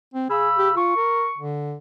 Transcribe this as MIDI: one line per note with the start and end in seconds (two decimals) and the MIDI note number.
0.14 0.27 60
0.29 0.75 49
0.29 0.49 68
0.29 0.75 83
0.29 0.75 88
0.58 0.69 67
0.76 0.92 65
0.76 1.40 85
0.97 1.28 70
1.38 1.75 50